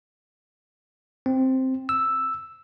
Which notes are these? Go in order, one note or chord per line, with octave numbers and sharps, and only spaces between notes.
C4
E6